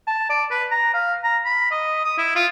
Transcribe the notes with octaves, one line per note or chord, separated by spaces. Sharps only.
A5
D5
B4
A#5
F5
A#5
B5
D#5
D#6
E4
F4